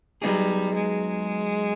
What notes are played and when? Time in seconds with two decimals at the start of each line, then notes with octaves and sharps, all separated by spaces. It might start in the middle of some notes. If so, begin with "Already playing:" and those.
0.22 F#3 G3 B3 D#4 G#4
0.75 G#3